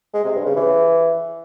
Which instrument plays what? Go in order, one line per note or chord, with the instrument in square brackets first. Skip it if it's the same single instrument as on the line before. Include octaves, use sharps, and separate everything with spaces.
[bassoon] G#3
C3
G2
C#3
E3